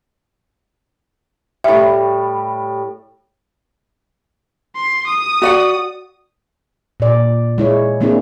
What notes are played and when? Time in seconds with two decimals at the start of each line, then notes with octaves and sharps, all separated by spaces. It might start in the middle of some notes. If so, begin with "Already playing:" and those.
1.64 A2 G3 E5
4.76 C6
5.07 D#6
5.42 F#4 D5 F#5
7.00 A#2 D5
7.58 G#3 E4 C#5
8.01 G#3 A#3 C4 D4 E4 G#4